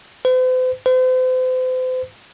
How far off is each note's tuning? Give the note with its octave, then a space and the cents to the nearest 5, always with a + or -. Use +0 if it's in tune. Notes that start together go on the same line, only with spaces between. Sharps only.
C5 -45
C5 -40